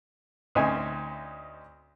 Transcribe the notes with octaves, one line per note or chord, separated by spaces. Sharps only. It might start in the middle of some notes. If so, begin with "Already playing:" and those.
D2 C4 C#4 D#4 E5 G#5